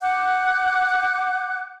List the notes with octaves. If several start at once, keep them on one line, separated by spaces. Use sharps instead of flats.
F#5 D6 F#6 G6